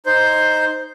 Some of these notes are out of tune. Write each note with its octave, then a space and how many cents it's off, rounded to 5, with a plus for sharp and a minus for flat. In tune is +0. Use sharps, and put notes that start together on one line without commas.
D#4 +0 C5 +5